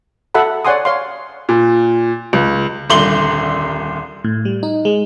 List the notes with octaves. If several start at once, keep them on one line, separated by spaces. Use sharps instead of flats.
F#4 A4 E5 F#5 B5
C#5 D5 F#5 G#5 C6 D#6
C#5 F5 C6
A#2
C#2
D#1 C2 D3 C6 F#7 G7
A2
G3
D#4
G#3